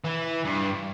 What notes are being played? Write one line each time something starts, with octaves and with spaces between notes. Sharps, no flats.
E3
G2